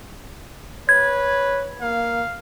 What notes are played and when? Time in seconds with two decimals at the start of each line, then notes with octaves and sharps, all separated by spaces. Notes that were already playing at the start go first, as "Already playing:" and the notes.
0.89 B4 C#5 G#6
1.81 A#3 F5